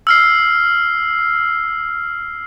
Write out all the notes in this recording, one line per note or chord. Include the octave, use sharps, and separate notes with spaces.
E6 F6 C7